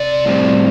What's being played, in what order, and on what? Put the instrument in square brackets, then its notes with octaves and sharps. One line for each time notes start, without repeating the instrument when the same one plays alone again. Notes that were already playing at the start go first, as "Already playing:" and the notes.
Already playing: [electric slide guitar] C3 D5
A2 G3 C4